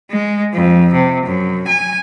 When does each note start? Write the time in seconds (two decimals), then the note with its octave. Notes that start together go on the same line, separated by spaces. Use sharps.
0.11 G#3
0.53 F2
0.94 C3
1.25 F#2
1.67 G#5